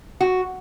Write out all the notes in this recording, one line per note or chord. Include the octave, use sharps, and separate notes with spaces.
F#4